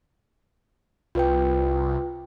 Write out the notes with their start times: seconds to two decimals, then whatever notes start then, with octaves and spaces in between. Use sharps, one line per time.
1.15 C2 F4 B4 G5